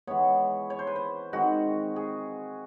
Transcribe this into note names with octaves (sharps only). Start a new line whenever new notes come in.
E3 G#3 B3 C#5
C#5
C5
B4
C5
D#3 G#3 C4 F#4
G#4